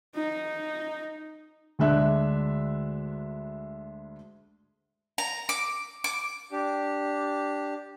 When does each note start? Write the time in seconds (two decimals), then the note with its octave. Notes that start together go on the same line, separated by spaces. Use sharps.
0.15 D#4
1.79 D2 G#3 D4 E5 F#6
5.18 A#5
5.49 D6
6.04 D6
6.52 D4 G4